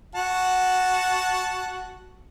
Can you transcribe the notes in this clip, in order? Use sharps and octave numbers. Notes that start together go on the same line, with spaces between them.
F#4 F#5 A5